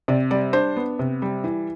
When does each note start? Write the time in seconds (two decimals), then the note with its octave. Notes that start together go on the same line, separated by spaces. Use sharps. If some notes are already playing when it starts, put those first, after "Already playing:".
0.08 C3 D5
0.31 G3 D5
0.53 D4 C5
0.76 B3
0.99 C3
1.22 G3
1.44 E3